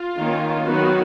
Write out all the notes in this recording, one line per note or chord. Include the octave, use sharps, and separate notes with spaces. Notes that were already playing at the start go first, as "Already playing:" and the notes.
Already playing: F4
D#3 A#3 C#4
D#3 F#3 B3 F#4